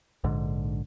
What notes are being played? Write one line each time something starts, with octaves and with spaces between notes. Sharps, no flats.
A#1 G#2 D3